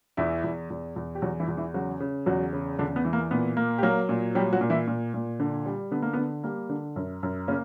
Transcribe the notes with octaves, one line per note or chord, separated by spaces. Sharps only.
E2 E3 E4
E2
E2
E2
G4
E2 F#3 F#4
E3 E4
E2
E3 E4
C#3 F#3 F#4
C#3
E2 F#3 F#4
C#3
E2 D3 D4
B3
E3
A#3
A#2 B3
A#3
G4
F#3 A#3 A#4
A#2
F#3 G3 G4
F#3 F#4
A#2
E3 E4
A#2
A#2
D3
G3
D3 B3
A#3
D3 B3
G3 A#3
D3
F#2
F#2
C#3 A#3 C#4